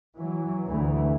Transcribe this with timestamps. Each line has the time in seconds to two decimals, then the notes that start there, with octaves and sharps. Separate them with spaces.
0.15 E3 F#3
0.66 D2 E3 A3